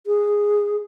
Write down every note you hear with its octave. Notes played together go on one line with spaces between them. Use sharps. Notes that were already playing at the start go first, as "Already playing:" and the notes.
G#4